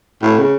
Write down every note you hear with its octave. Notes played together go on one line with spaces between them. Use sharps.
A2
C#3